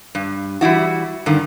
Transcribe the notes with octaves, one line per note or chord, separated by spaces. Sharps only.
G2
E3 G3 E4 F#4
G2 D3 D#3